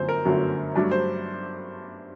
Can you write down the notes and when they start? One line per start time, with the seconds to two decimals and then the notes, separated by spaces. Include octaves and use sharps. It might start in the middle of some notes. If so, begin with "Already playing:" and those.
Already playing: G1 F#2 D3 F#3 A3 C5
0.09 A#4
0.25 G1 F#2 D3 F#3 A3
0.75 G2 F#3 A3 D4
0.91 C5